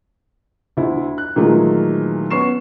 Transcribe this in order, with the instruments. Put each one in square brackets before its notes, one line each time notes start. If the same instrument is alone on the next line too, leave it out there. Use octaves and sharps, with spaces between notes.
[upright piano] D2 E4
F#6
A#2 D#3 E3 F#3 G#3 A3
B3 C#4 C#6 C7 E7